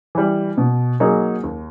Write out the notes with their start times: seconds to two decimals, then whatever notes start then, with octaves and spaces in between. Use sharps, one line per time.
0.15 E3 G3
0.58 B2
1.00 F#3 A#3 D#4 G#4
1.44 D#2